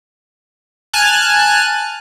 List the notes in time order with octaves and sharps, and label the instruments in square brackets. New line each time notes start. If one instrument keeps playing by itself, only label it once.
[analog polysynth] G#5 A5 F6 F#6